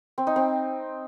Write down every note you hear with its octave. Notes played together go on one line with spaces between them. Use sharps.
C4
D#4
C4